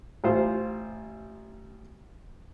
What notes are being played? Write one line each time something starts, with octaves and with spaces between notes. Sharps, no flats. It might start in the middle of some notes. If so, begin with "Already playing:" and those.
A1 F4 C5